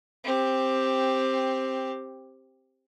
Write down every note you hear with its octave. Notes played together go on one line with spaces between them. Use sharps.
C4 G4